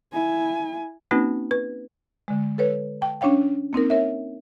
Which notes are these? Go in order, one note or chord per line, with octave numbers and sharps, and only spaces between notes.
E4 G#5
A#3 C4 C#4 D#4 F#4 B4
B4
D3 G#3
A4 B4 C#5
G5 A5
C#4 D4 C#5 F5 G5
A#3 C4 D#4 A#4
A#4 C#5 E5